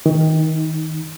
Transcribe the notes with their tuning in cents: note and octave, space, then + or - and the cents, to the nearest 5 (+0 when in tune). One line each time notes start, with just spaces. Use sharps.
D#3 +25 D#4 +0